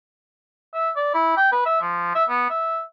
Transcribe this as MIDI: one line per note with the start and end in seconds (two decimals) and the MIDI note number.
0.74 0.90 76
0.96 1.13 74
1.14 1.36 64
1.37 1.50 79
1.52 1.63 71
1.66 1.81 76
1.81 2.11 53
2.15 2.24 76
2.29 2.48 59
2.50 2.82 76